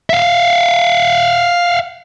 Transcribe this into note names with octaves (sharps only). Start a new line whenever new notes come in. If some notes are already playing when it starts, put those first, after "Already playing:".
E5 F5